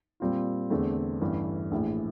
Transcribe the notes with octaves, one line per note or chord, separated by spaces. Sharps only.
A#2 G3 C4 F4
E2 D3 A3 C4
A1 G2 E3 A3
A#1 A2 E3